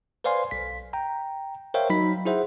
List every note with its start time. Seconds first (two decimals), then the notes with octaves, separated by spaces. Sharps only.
0.24 B4 C5 D5 F5 G#5 C6
0.51 B1 B6
0.93 G5 A#5
1.74 A#4 C5 C#5 E5 F5 G5
1.90 F#3 D#4 B5 B6
2.25 E4 G#4 C5 E5 F#5